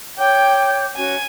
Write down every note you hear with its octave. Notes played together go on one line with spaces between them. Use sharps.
C#5 G5 D6 G6
C#4 F#4 G#5